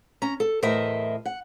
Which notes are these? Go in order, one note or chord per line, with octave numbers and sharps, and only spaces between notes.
C#4 A#5
A4
E2 A2 A#4 C5 D#5 E5
F#5